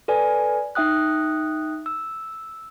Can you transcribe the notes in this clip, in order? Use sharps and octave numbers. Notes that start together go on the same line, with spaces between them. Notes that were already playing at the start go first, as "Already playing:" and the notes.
A4 B4 D5 G#5
D#4 E5 G5 D#6 F#6
E6